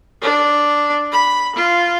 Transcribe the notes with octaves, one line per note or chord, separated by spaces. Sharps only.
D4
B5
F4